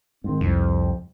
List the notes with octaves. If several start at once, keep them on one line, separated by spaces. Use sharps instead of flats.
G#2 D#3 C4
C2 F2 F3